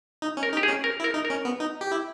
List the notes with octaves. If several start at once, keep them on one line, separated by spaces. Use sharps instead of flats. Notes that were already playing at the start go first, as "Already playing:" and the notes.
D#4
C#4
A#4
D#4
G4
G#4
C#4
A#4
E4
A#4
D#4
A#4
C#4
B3
D#4
G4
E4